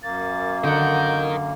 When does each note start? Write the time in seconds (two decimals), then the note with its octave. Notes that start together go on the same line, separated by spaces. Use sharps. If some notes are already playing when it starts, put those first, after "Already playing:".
0.03 F#2 A#3 A6
0.64 D3 A#4 D#5 F#5 G6